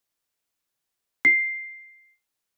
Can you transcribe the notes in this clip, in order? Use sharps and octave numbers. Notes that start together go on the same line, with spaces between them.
C7